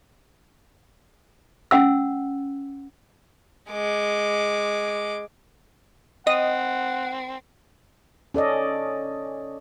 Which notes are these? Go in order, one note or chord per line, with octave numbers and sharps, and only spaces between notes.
C#4 F#5 E6
G#3 D6
C4 D#5 F#5
C#4 A4 D5 D#5